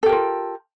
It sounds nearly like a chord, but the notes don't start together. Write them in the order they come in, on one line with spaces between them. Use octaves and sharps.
A4 G4 A#4 F4